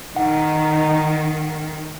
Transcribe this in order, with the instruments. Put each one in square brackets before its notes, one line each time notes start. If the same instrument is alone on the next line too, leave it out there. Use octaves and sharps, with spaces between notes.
[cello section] D#3 [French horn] D#4 [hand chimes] F#5